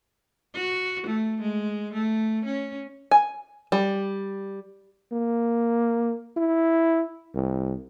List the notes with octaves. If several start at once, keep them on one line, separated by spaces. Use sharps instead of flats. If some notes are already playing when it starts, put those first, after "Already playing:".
F#4
A3
G#3
A3
C#4
G#5
G3
A#3
E4
C2